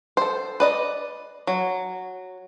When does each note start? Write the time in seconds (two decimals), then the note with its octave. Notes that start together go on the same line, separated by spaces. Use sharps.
0.17 A4 C5
0.60 B4 D5 D#5
1.47 F#3